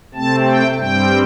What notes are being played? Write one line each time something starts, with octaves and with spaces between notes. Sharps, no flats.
C3 A3 C4 A5
G5
G2 G3 C4 G5